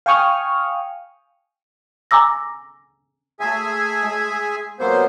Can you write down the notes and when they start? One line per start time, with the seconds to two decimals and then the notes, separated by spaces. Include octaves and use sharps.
0.06 F5 G5 G#5 C#6 D#6 F6
2.11 G#5 A#5 D6 E6 A#6
3.40 A3 G#4 A4 E5 G#5 C6
4.02 G#3
4.80 C3 F#3 A#3 B3 C5 C#6